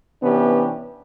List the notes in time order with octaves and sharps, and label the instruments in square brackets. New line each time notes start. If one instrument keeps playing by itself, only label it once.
[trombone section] C3 E3 B3 C#4 D4 G4